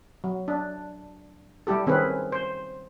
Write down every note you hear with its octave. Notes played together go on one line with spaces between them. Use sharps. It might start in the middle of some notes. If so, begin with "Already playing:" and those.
F#3
D4
G3 E4 G4 A4
D#3 C4 C#4 G#4 B4
C5